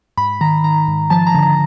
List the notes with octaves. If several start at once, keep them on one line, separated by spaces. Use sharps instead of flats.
G#2 B5
D#3 A#5
D#3 A#5
G#2
F3 A5
A#5
D3
A#5